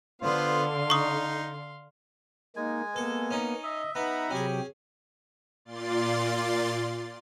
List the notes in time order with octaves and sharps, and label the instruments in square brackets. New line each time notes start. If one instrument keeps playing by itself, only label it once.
[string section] D3 [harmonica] B3 F4 C5 [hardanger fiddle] F5 C6
[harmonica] D#4 [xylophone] C#6 D#6
[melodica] G#3 G#5 [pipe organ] A#3 D#4
[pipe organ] A#3 B3 [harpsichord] A4
[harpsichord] C#4 D#4
[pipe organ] D#5 [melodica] E5
[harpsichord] B3 [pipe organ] D#4 E5 F#5 [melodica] A#5 B5
[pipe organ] C3 F#3 G4 [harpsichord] C#4 G#4
[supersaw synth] A#2 F4 D5 C6 A6